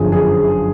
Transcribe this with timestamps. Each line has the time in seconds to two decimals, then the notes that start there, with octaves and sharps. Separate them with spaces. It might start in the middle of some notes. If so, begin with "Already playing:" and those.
Already playing: G1 F#2 D3 F3 G#4
0.12 G#4